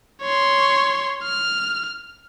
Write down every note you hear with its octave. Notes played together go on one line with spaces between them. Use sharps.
C#5 C6
F6